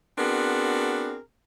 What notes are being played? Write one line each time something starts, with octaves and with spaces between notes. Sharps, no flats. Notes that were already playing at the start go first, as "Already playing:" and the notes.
B3 C4 D4 F#4 G#4 A#4